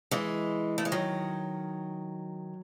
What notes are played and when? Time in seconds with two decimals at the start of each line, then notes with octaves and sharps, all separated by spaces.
0.11 E3 G#3
0.78 A3
0.85 G#3
0.92 D#3 F#3